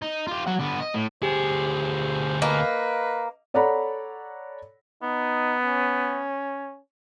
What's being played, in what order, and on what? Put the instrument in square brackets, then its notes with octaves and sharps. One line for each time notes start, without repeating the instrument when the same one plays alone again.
[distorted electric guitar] D#4
F4 G4
F#3 F#5
D3 B3
D#5
A2
[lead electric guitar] D2 G#4 [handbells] G4 [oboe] C5
[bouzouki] A#3 [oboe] B4 [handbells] D#5
[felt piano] A4 C#5 D5 F#5 A#5 B5
[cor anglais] B3 [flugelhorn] D#4
[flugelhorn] C#4